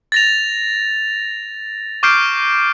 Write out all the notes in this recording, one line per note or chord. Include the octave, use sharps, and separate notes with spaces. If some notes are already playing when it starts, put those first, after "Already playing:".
A6 A#6 F7
C#6 D6 F6 G6 C7 D7